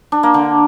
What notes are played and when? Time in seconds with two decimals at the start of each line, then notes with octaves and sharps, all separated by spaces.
0.12 D4
0.23 A#3
0.34 D3